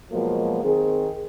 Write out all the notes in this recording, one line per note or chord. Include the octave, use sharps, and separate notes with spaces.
B2 F3 F#3 G#3 A#3
D#3 C4 G#4